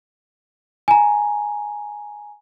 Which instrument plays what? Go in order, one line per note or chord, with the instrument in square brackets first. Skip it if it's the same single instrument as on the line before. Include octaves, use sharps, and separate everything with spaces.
[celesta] G#5 A#5